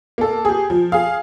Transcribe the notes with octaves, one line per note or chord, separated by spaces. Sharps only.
A#3 A4
G4 G#4
F3
G#4 F5